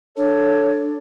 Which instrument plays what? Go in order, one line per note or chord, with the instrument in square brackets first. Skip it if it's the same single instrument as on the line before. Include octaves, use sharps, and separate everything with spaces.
[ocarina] D4 [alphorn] A4 [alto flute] C#5